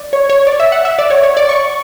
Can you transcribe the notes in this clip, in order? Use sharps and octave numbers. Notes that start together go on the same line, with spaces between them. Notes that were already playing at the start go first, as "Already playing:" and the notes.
Already playing: D5
C#5
C#5
D5
E5
F#5
E5
D5
C#5
C#5
D5
C#6